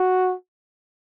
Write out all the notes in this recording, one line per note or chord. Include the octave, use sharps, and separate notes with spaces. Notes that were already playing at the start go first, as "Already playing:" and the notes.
Already playing: F#4